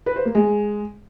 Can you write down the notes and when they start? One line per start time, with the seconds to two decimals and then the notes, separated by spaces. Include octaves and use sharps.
0.06 B4
0.16 C5
0.25 A#3
0.35 G#3